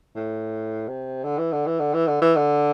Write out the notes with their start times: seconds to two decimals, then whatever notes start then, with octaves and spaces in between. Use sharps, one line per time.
0.16 A2
0.88 C3
1.24 D3
1.38 E3
1.53 D3
1.67 E3
1.79 D3
1.94 E3
2.07 D3
2.22 E3
2.36 D3